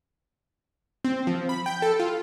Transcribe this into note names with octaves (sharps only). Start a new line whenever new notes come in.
C4
F3
B5
G5
A4
F4